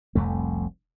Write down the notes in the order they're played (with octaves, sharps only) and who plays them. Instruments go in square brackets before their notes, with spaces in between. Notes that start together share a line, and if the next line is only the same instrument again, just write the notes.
[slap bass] F1 C2 F2 A3